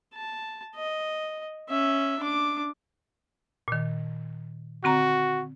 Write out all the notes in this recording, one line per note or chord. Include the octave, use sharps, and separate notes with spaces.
A5
D#5
C#4 E5
D4 D6
A#2 D#3
D3 C4 F#4 A#5